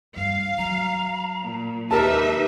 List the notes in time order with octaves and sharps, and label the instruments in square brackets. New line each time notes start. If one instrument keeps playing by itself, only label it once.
[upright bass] G2 [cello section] F5
[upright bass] F#3 [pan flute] A#5
[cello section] A#2
[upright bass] D#2 [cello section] D#4 B4 E5 [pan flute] G4 [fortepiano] A#4 A5